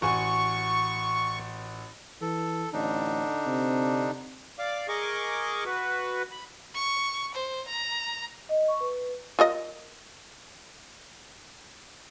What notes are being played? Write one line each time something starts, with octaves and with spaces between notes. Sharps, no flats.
A1 F#4 G#5 C#6
E3 A4
A1 D3 D4 D#4
C3
D5 F5 D6
G#4 A#4 D#5 C#6 D6
F#4 B4
B5
C#6
C5
A#5
D#5
C#6
B4
F4 A#4 D#5